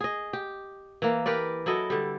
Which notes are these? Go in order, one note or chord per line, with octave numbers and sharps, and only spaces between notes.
G#4 D#5
G4
E3 A#3
G4 A#4 B4 D5
F#3 E4 A4 D#5
D3 G3